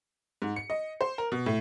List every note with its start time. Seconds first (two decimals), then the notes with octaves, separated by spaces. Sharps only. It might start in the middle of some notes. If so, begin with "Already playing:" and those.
0.42 G#2
0.56 C#7
0.70 D#5
1.01 C5
1.18 A#4
1.32 B2
1.46 A2